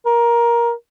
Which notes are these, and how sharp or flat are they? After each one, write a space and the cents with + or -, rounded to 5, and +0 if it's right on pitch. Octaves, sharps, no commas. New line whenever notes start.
A#4 +15